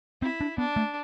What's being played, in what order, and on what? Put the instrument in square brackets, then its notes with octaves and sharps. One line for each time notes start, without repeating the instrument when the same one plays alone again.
[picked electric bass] C4 [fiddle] E4
[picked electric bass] D4
[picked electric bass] B3 [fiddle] D4
[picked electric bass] A3